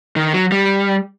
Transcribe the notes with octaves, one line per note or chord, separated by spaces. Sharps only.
D#3
F#3
G3